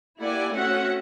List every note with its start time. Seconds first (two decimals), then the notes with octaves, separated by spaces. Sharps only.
0.20 A#3 E4 G4 D5 F#5 G#5
0.53 A3 C4 C#4 F#4 E5 F#5